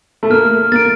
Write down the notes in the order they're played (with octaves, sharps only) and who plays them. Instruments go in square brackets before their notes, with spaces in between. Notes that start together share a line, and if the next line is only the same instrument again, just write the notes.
[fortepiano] A3
[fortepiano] A#3 [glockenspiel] F6
[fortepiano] A#3 [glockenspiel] A6 D7